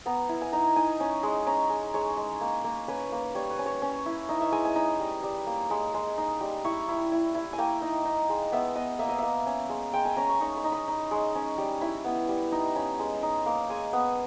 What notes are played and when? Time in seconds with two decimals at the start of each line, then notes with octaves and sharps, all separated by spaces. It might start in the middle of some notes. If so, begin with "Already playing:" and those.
0.06 B3 A#5
0.29 E4
0.41 G#5
0.52 D#4 A#5
0.76 D#4 G#5
1.00 C#4
1.23 G#3
1.46 C#4 A#5
1.70 G#3
1.94 G#3 C#5
2.17 G#3
2.41 A#3
2.64 A#3
2.88 C#4 B4
3.12 A#3
3.35 G3 C#5
3.51 B4
3.59 C#4
3.66 C#5
3.82 C#4
4.06 E4
4.29 D#4 E5
4.41 E5
4.52 G#3 G#5
4.65 G#5
4.75 D#4 B5
5.00 G3
5.23 G3
5.47 A#3
5.70 G#3 B5
5.94 G#3
6.17 D#4
6.41 G3
6.64 E4 C#6
6.88 E4
7.12 E4
7.35 E4
7.53 G#5
7.58 A#3 G5
7.82 D#4
8.05 D#4
8.29 G#3
8.52 B3 E5
8.75 B3 D#5
8.99 A#3 E5
9.09 D#5
9.18 A#3 E5
9.47 C#4
9.69 G#3
9.93 G#3 G5
10.05 G#5
10.16 C#4 A#5
10.29 C#6
10.41 D#4 C#6
10.57 B5
10.64 D#4
10.72 B5
10.88 D#4
11.11 G#3
11.35 C#4
11.58 G3
11.81 E4 B5
12.05 B3
12.29 G3
12.52 D#4
12.76 C#4 B5
12.99 G#3
13.23 D#4
13.46 A#3
13.70 G#3 G#5
13.93 B3